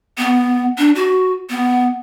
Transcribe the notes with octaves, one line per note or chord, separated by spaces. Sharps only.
B3
D4
F#4
B3